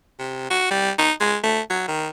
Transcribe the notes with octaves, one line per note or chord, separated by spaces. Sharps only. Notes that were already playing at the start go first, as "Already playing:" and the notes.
C3
F#4
G3
D#4
G#3
A3
F#3
D#3